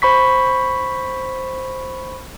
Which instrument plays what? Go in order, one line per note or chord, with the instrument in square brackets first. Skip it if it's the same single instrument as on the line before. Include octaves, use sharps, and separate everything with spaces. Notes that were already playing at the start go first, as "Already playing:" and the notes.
[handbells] C5 B5 C#6 B6